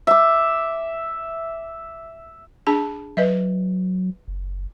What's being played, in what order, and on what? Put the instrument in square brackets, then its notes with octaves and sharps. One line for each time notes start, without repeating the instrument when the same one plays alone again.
[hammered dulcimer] E5 D6
[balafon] D4 G#4 A5
[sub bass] F#3 [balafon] B4 D#5 E5
[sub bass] F#1